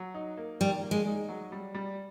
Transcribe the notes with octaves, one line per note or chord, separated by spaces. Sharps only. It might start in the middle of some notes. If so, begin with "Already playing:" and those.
Already playing: F#3
D#4
A#3
D#3 G3
A#3
G#3
D#4
F#3
G3
G3